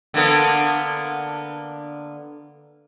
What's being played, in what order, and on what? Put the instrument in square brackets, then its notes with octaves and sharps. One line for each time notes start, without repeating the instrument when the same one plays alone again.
[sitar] D3 A#3 B3